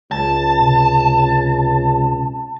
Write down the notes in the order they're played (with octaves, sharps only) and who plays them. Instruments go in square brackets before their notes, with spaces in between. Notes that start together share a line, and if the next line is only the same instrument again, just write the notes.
[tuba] C#2 [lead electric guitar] A5
[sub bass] C3